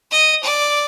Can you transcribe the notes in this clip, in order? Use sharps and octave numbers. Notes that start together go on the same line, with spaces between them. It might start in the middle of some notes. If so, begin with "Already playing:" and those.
D#5
D5